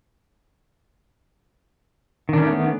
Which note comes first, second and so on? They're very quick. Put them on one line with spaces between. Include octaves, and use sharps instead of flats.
D#3 D4 C#4 A3 B3